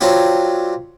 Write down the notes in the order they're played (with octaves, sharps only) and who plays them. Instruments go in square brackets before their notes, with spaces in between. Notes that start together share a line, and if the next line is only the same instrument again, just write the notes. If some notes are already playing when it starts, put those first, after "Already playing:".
[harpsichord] F#3 C4 D4 F4 G4